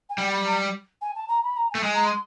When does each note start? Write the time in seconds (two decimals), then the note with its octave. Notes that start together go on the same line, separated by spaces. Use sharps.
0.09 G#5
0.18 G3 G5
0.32 B5
0.45 A#5
1.01 G#5
1.15 A5
1.28 A#5
1.43 B5
1.56 A#5
1.70 G#5
1.75 A3
1.80 A5
1.83 G#3 G#5
1.94 A#5
2.05 C6